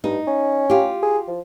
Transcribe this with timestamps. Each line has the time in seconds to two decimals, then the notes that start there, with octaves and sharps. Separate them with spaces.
0.04 G2 D#4
0.27 C#4
0.70 F4 G4
1.02 G#4
1.28 F3